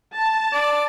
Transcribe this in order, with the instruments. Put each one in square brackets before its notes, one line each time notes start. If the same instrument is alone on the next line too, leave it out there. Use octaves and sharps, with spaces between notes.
[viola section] A5
[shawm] D5